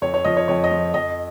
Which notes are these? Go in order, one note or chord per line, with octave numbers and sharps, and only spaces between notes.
F2 C#5
C#5
F3 D#5
C#5
F2 C#5
D#5
F3
F2 D#5